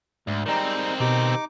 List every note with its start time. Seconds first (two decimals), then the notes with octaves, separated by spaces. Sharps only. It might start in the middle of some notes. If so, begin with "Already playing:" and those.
0.27 D2 G#2
0.46 D#3 G3 G#3 C4 D#4 D5 A#5
1.00 B2 D#4 G4 D6